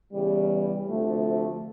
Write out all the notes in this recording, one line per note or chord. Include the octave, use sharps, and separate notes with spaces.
E2 C#3 E3 G3
D2 C3 F3 A3